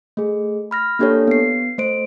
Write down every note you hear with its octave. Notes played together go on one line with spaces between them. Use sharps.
A3 G#4
B5 F6 A#6
A#3 D4 G4 A4 C#5
B3 C7
A3 C5 D7